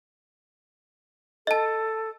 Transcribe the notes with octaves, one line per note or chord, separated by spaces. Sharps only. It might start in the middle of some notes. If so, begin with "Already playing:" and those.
A4 D#5 A5